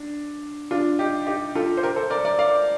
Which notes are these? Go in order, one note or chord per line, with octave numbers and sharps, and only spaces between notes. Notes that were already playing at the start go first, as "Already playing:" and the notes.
Already playing: D4
D4 F4
D#4 G4
D#4 G4
F4 A4
C5
G4 A#4
A4 C5
A#4 D5
A#4 D5
D5 F5